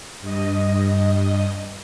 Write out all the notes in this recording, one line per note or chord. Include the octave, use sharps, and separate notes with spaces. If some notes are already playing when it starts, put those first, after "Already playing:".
G2 D#5